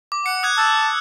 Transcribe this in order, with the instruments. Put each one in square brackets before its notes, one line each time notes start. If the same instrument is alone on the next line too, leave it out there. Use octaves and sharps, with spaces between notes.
[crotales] D6
[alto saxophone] F#5 [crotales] C#7
[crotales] D#6 F#6 G#6
[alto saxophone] A5 [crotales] E6 F#6